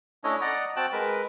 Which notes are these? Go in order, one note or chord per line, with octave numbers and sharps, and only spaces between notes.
A3 C#4 D4 E4 C#5 D#5
D5 D#5 F#5 A#5
C4 F#4 G5 A5 F#6
G#3 A#4 B4